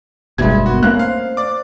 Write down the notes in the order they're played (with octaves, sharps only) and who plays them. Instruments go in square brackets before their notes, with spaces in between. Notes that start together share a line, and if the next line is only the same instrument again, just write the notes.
[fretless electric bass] F#1 B1 G2 [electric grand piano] G#3 G#6 [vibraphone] E5 B5 C6
[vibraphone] B3 D#4 A#4 [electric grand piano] F#4
[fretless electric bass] A3 A#3 C#4 [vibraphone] C4 F5 [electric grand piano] F#6
[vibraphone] C5 [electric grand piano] F5
[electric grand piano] D5 D6